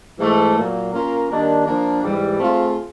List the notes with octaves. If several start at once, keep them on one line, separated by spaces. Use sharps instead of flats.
G#2 E3 A3
A#2 F#3 A#3
A#3 C#4 F4 A#4
D#3 G3 A#3 D4
F3 A#3 D4
G#2 E3 G3
A3 C4 F4 G#4